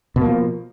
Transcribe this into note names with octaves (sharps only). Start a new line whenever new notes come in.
B2 F3 A#3